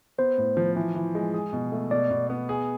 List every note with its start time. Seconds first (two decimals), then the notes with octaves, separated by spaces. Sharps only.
0.18 B3 C5
0.38 A2
0.57 F3
0.76 E3
0.95 E3
1.15 G#3
1.34 G#4
1.53 B2
1.72 A3
1.91 B2 D5
2.11 B2
2.30 B3
2.49 G#4